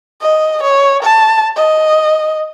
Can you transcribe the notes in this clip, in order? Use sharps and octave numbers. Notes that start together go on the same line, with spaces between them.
D#5
C#5
A5
D#5